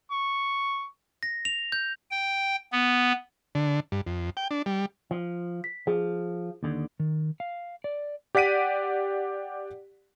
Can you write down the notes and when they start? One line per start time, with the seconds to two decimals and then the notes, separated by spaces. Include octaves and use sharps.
0.11 C#6
1.23 A#6
1.45 F7
1.72 G6
2.11 G5
2.72 B3
3.55 D3
3.92 G2
4.07 F2
4.37 G5
4.51 D4
4.66 G3
5.11 F3
5.64 B6
5.87 F3 G#4
6.63 D#2 D3
7.00 D#3
7.40 F5
7.84 D5
8.35 G4 D5 F#5 B6 D7 D#7